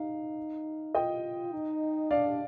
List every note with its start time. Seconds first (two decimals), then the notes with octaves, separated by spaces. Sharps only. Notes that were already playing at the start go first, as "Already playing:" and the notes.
Already playing: D#4 F5
0.95 F4 D#5 G5
1.53 D#4
2.11 D4 D5 F5